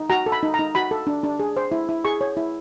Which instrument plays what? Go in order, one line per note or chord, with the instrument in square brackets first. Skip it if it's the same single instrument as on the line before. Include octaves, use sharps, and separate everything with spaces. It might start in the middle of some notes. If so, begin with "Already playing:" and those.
Already playing: [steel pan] D#4
F#4 A#5
A4
B5
D#4
A#5
D#4
F#4 B5
A4
D4
D4
G#4
C5
E4
E4
G#4 C#6
C#5
E4